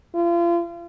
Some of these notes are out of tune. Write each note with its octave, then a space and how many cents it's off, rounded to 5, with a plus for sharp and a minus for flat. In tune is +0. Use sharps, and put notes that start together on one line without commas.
F4 -35